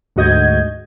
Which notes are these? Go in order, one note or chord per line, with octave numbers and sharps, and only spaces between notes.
D2 G#2 F#4 D#5 G6 G#6